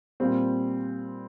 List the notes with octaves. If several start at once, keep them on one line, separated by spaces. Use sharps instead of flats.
A#2 G3 C4